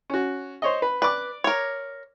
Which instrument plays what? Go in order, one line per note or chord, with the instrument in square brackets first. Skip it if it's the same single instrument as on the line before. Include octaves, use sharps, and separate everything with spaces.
[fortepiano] C#4 F#4
C5 C#5 D#5
B4
[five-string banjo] B4 [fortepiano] D5 D6
[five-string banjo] A#4 C#5